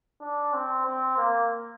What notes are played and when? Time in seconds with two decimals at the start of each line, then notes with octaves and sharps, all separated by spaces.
0.21 D4
0.53 C4
0.86 C4
1.17 A#3